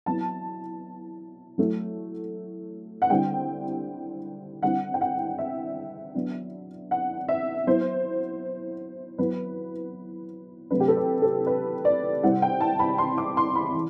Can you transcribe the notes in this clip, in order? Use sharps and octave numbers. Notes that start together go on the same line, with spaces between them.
F#3 B3 E4 A5
F#3 A3 E4
F#5
D3 G3 C4 E4 G5
D3 G3 C4 E4 F#5
G5
F#5
E5
F#3 B3 D4
F#5
E5
F#3 B3 E4 C5
F#3 B3 E4 B4
C3 F#3 A3 D4 B4
G4
A4
B4
A4
B4
D5
C3 G3 C4 E4 F#5
G5
A5
B5
C6
D6
C6
B5
E3